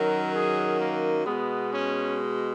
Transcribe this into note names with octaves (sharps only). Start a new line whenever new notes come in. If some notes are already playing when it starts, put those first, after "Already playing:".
Already playing: F#2 D#3 F#3 A#4
G#4
A#3
B2 G#3 B3
C#4